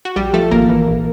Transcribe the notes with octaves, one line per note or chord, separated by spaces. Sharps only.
F#4
A#1 G3 G4
F3 A3 A4
G#1 A#3 A#4
E3
A#1